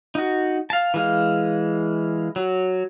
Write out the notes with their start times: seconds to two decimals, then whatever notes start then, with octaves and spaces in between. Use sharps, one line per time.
0.15 D#4 F#4
0.70 F5 A5
0.94 E3 G#3 F5
2.36 F#3